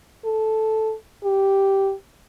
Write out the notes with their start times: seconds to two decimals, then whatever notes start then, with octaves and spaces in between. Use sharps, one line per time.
0.25 A4
1.24 G4